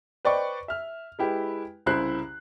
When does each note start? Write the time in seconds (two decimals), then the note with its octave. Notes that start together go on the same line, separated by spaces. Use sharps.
0.25 B4 C5 D5 D#5 G5 C#6
0.68 E5 F6
1.19 G#3 E4 G4 B4
1.86 C2 C#3 E4 C5 F#6 C7